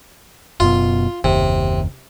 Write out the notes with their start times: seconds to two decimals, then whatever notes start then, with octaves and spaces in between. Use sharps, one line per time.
0.60 F#1 F#2 B2 F4
1.24 F#1 D#2 C3